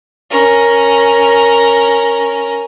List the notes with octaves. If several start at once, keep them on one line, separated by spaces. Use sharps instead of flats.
C#4 A#4